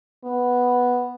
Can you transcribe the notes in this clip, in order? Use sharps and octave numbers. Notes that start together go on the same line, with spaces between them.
B3